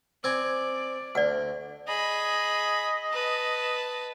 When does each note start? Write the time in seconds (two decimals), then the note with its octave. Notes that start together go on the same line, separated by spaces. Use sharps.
0.24 C4 D5 G#5
1.15 D2 D5 F#5
1.88 G#4 D#5 B5
3.12 B4 A5